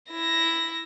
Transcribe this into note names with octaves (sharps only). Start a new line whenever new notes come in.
E4 A#6